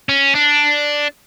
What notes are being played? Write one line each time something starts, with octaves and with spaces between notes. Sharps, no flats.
C#4
D4